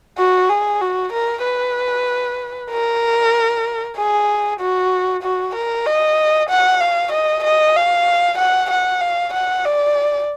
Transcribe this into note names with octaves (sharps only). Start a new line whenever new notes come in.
F#4
G#4
F#4
A#4
B4
A#4
G#4
F#4
F#4
A#4
D#5
F#5
F5
D#5
D#5
F5
F#5
F#5
F5
F#5
D5